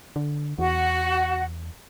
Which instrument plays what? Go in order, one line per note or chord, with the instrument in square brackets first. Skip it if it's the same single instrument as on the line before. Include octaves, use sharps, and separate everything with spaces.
[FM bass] D3
[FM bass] E2 [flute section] F#4 F#5